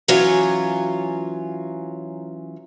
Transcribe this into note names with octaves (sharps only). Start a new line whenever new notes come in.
E3 F#3 C#4 F4 C#5